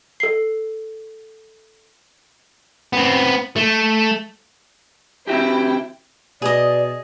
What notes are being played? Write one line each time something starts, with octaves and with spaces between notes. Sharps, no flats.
A4 C7
B3 C4
A3
C4 E4 F#4 G4 G5
B2 G#4 D5 D#5